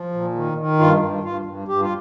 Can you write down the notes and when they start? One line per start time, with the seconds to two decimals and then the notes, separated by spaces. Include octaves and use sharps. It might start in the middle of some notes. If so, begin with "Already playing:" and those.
Already playing: F3
0.12 A#2
0.34 D#3
0.58 D#3
0.79 G2 F4
1.02 G2
1.24 G2 F4
1.45 G2
1.68 G2 G4
1.81 F4